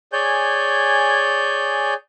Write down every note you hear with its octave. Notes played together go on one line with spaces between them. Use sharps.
G#4 C#5 D5 G#5 G6